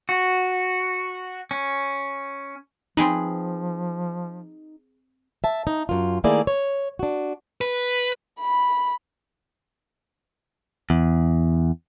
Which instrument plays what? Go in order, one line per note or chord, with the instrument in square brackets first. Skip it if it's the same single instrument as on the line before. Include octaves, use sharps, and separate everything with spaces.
[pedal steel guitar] F#4
C#4
[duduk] F3 [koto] C4 G#4 B4 [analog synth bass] D#4
[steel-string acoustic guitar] E5 A5
D#4
F#2 F4
D#3 A3 A#3 E4 G#4 D5
C#5
D4 F#4
[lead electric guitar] B4
[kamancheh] B5
[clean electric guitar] E2